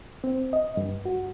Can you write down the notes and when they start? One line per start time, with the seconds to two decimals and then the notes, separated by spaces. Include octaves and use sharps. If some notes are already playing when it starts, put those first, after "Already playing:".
0.24 C4
0.53 D#5
0.77 G2
1.05 F#4